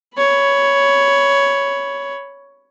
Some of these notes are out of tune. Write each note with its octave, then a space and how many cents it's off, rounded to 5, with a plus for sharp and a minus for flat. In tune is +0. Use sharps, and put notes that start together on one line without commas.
C#5 +10 B5 +0